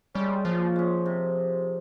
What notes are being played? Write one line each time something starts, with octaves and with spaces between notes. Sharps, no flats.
G3 G#3 C#4
A#2 F3
G#3 C#4
C3